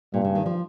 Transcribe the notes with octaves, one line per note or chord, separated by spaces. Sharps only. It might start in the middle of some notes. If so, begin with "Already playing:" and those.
G2 A#2
C#3
D#3
F3